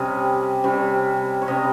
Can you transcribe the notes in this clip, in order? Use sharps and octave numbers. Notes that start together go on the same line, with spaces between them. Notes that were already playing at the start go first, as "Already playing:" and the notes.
Already playing: C3 G3 C#4 D#5
C3 G3 C#4
C#5
C3 G3 C#4 D#5